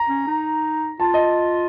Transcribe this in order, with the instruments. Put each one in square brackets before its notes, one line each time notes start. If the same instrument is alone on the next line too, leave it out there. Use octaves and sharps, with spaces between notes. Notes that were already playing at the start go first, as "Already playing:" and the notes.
Already playing: [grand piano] A#5
[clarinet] C#4
D#4
[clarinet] F4 [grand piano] A5
[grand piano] D#5